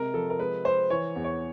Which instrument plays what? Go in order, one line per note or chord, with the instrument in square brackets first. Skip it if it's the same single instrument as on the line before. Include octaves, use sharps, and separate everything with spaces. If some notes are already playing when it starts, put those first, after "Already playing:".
Already playing: [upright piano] C3 G#3 A#4
F3 A4
A#4
G#3 B4
G#3 C5
E3 C#5
E2
C#5